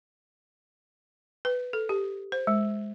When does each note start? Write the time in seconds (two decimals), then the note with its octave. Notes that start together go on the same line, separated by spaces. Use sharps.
1.45 B4
1.73 A4
1.89 G4
2.32 C5
2.47 G#3